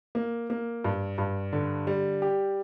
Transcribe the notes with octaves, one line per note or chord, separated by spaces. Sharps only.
A#3
A#3
G2
G2
D3
G3
G4